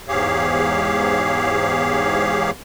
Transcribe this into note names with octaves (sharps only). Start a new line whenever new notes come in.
E2 G#2 G4 G#4 C#5 F5